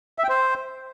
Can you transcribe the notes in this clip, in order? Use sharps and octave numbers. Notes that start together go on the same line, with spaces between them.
E5
G5
C5